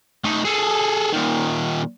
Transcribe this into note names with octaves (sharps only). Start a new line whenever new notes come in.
A3 D#4
G#4 A4
A#2 D#3